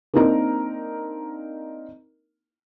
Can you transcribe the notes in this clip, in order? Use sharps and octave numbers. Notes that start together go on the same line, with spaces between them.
A#3 C4 D4 D#4 A#4